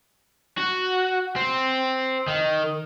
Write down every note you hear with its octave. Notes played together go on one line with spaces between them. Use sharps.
F#4
C4
D#3